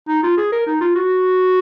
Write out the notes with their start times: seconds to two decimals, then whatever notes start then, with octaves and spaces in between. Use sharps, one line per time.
0.08 D#4
0.23 F4
0.38 G#4
0.52 A#4
0.67 D#4
0.81 F4
0.96 F#4